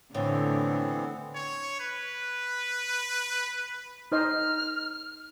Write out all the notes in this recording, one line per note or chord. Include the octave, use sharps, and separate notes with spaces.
A2 D3 E3 B3 C4
C#5
B4
D#4 C5 D#5 F6